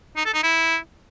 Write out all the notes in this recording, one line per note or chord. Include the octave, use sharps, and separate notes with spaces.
D#4
A4
D#4
E4